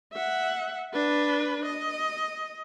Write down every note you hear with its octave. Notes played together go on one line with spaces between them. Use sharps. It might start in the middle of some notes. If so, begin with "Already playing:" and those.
E5 F#5
D4 B4
D#5